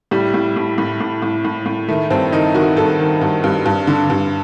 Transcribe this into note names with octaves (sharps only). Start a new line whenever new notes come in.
A2 G3
A2
A2
A2
A2
A2
A2
A2
D#3 A3
G2 C4
D#3 D#4
D#3 F#4
G2 A4
D#3
G2
G2
G2
D3
G2